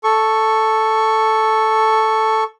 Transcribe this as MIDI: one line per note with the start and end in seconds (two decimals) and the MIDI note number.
0.04 2.44 69
0.04 2.44 85